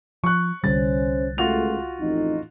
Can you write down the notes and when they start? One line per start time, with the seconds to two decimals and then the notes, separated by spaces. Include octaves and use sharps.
0.24 F3 C#6 F#6
0.64 C2 D3 G3 C#4 C5 A6
1.38 C#2 A3 F4 F#4 F7
2.01 A1 F2 D#4